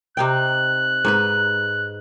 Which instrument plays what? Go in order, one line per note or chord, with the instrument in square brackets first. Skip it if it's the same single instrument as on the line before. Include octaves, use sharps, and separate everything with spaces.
[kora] C3 D#4 G5 [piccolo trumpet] F#6
[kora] G#2 D#4 B4